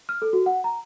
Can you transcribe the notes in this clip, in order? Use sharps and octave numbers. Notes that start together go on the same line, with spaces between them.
F6
A4
F#4
F#5
A#5